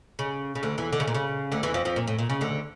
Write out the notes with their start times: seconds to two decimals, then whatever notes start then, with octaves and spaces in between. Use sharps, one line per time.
0.19 C#3
0.55 C#3
0.63 D2 D3
0.78 E2 E3
0.93 D3
1.00 C#3
1.07 A#2
1.14 C#3
1.52 D2 D3
1.63 E2 E3
1.74 F2 F3
1.85 F2 F3
1.96 A#2
2.07 A2
2.18 A#2
2.30 C#3
2.41 D2 D3